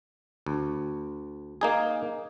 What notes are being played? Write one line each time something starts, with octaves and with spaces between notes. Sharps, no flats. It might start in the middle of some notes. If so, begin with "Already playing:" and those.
D2
A#3 D#4 G#4